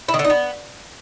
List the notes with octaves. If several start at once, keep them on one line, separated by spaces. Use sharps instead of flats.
E4
D#3
D3
D#4
B3